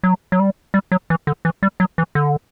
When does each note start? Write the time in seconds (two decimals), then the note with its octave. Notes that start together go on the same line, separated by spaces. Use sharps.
0.04 F#3
0.32 F#3
0.40 G3
0.74 G3
0.92 F#3
1.10 E3
1.27 D3
1.45 E3
1.63 G3
1.80 F#3
1.98 E3
2.15 D3